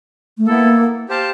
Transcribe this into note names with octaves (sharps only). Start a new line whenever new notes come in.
A3
A#3 B3 E4 A4
G4 C5 F5 A5